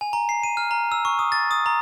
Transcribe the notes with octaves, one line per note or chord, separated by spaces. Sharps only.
G#5
A#5
C7
D#7
F6
A#5
E6
C#6
D#6
A6
D#6
A#5